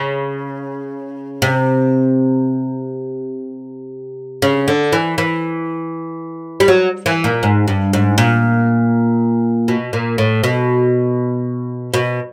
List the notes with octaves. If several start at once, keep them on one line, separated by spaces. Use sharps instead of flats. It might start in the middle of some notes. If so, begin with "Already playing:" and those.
Already playing: C#3
C3
C#3
D3
E3
E3
G3
F#3
E3
A#2
G#2
G2
G#2
A#2
B2
A#2
A2
B2
B2